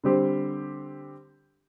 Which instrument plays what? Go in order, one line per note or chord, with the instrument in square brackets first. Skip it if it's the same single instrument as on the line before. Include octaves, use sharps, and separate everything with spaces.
[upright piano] D3 G3 C4 G4 C5